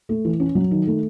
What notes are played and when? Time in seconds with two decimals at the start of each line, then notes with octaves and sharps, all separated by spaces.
0.09 A3
0.25 E3
0.40 C#4
0.55 F#3
0.71 D#3
0.87 A3